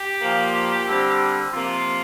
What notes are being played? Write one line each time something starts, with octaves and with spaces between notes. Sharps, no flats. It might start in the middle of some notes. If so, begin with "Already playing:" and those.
Already playing: G4
A#2 F3 A#3
D3 G3 C4
C3 F3 A#3 F4